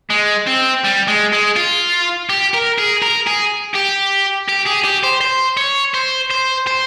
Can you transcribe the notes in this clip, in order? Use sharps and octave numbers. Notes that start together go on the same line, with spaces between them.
G#3
C4
G3
G#3
G#3
F4
G4
A#4
G#4
A#4
G#4
G4
G4
G#4
G4
C5
C5
C#5
C5
C5
C5